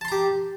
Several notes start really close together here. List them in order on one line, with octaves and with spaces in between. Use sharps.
A5 C6 A#5 G4